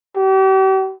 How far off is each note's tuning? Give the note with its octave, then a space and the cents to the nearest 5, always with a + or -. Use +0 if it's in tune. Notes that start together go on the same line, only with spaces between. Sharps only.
G4 -40